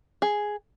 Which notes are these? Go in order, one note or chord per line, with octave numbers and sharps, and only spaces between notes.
G#4